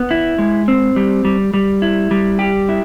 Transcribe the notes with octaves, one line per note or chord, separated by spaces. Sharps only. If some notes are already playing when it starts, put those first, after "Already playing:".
Already playing: B3
E4
G#3
C4
G3
G3
G3
E4
G3
G4
E4